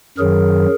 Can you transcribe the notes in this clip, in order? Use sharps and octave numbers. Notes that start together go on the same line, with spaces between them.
F#2 D#3 F#3 G#4 A#4